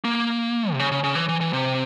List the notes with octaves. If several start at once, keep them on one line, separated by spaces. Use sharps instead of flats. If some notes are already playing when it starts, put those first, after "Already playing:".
A#3
C3
C#3
C#3
C#3
E3
E3
E3
C3